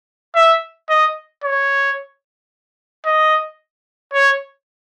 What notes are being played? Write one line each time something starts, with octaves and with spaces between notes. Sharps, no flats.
E5
D#5
C#5
D#5
C#5